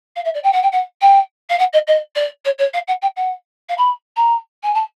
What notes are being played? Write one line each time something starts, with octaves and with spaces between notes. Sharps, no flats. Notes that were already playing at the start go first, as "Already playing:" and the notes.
F5
E5
D5
G5
F#5
G5
F#5
G5
F5
F#5
D#5
D#5
D5
C#5
C#5
F5
F#5
G5
F#5
F5
B5
A#5
G#5
A5